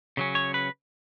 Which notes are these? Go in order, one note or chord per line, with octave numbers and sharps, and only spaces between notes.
C#3 F#3 C#4
C#5
B4